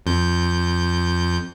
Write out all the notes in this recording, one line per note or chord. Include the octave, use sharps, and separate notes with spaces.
F2 G6